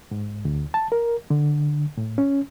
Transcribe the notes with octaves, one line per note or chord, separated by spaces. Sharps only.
G#2
D2
A5
A#4
D3
A2
C#4